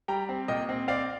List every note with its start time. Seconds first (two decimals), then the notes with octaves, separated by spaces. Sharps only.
0.08 G3 G5 A#5
0.29 C4
0.48 A#2 D#5 G5
0.69 C4
0.88 C4 D5 F5